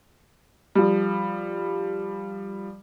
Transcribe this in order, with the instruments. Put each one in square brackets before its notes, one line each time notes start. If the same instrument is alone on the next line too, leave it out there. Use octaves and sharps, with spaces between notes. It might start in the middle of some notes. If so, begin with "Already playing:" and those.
[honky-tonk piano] F3 G3